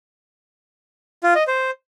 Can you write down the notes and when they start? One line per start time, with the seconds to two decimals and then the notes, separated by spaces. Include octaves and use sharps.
1.24 F4
1.36 D#5
1.47 C5